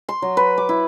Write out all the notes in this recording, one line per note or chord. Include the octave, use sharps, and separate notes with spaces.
C6
F#3
B4
D6
E4